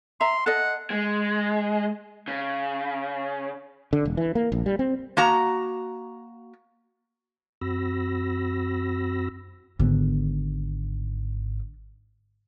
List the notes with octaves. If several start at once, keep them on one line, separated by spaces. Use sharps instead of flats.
E5 A#5 C6
A4 D#5 F#5
G#3
C#3
D3
E1
E3
A#3
A#1
G3
C4
A#3 F#4 A#5
F#2 C4 F#4 B5 E6 A#6
G#1 D3 B3